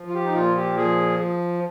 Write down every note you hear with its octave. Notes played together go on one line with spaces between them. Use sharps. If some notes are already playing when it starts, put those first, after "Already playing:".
Already playing: F3
F4
G4
D#4
A#2 F4
G4
F3 G#4